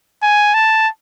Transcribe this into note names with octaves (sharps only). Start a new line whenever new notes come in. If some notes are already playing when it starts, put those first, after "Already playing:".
G#5
A5